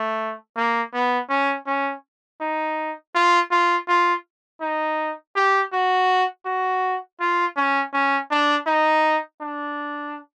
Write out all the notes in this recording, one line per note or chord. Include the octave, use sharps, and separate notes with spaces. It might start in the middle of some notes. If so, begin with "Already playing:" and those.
Already playing: A3
A#3
B3
C#4
C#4
D#4
F4
F4
F4
D#4
G4
F#4
F#4
F4
C#4
C#4
D4
D#4
D4